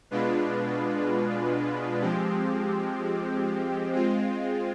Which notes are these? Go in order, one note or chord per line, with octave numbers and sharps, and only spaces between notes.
B2 G#3 D4 F4 B4
F3 G#3 C4 G4
G#3 C4 F4